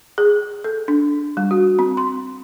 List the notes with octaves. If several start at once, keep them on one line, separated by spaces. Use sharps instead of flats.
G#4
A4
D4
G3
F#4
C4
C6